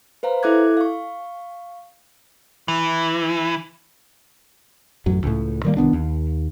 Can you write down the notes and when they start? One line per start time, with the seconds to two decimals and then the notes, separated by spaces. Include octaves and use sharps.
0.23 B4 C5 F5 A#5
0.43 E4 A4 E5 D6 F#6 G#6
0.77 F5 C#6
2.68 E3
5.06 A1 F#2 F#3
5.24 C#2 A2
5.65 D#3 G3 A#3
5.77 C2 D#3 B3 D4
5.93 D#2